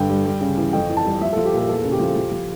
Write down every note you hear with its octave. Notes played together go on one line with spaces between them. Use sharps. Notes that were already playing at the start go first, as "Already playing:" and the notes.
Already playing: G2 D3 G5
G3
G3
C#3
E3
F2 G5
E3
A5
G3
F3 E5
F3 A4
G4
A#2 A4
E2 A4
C#3
G4
F3
F3
F3